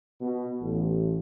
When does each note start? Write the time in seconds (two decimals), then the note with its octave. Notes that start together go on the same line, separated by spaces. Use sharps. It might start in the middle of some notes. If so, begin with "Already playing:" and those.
0.21 B2
0.60 A1